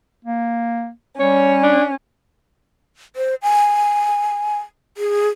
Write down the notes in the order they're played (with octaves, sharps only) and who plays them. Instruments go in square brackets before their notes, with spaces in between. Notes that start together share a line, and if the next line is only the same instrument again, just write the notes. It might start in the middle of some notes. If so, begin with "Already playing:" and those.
[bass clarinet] A#3
[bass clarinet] G3 [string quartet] C#4 [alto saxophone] C#5
[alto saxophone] D4
[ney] C5
G#5
G#4